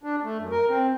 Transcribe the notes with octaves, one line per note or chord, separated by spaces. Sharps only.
D4
A3
F#2
A#4
C4